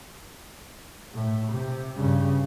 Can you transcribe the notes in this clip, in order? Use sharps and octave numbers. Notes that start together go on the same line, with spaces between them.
A2
C3
G2 C#3